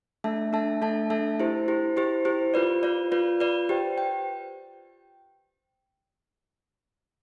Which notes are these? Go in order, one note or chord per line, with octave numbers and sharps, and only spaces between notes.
A3 D4 A4 E5 A5
A3 D4 A4 E5 A5
A3 D4 A4 E5 A5
A3 D4 A4 E5 A5
E4 G4 C5
E4 G4 C5
E4 G4 C5
E4 G4 C5
F4 B4 D5
F4 B4 D5
F4 B4 D5
F4 B4 D5
G4 C5 G5
G5